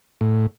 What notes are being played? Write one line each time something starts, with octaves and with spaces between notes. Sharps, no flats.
A2